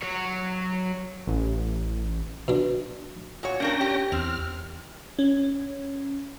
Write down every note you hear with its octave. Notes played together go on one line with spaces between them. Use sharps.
F#3 C#5
A1
B2 D4
A#2 F#4 C#5
A#3 C#4 D4 A#4 G5 A#6
G4
E2 C4 F6
C#4